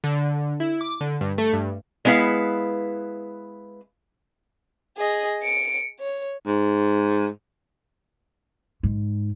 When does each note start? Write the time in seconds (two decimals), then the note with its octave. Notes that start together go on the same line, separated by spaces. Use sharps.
0.04 D3
0.60 E4
0.81 D6
1.01 D3
1.21 G2
1.38 A3
1.53 G2
2.05 G#3 B3 E4 B4 F5
4.97 G#4 D#5
5.43 C#7 D7
6.00 C#5
6.46 G#2
8.83 G#2